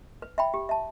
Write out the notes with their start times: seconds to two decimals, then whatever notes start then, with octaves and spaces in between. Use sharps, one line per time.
0.22 B4
0.38 E5 G5 B5
0.54 G4
0.69 E5 A5